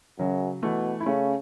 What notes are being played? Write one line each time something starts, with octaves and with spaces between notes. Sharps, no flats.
F#2 C#3 F#3
B2 E3 A3
E4
C#3 A3 C#4